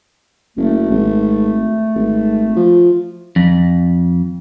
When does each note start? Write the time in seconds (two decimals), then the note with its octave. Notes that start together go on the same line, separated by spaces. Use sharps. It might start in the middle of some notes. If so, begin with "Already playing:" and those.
0.57 F#1 A3
0.90 G#1
1.95 G#1
2.56 F3
3.36 F2